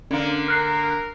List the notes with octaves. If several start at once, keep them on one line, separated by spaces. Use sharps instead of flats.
D3 A#3 C#4
A#4 F6 F#6 C7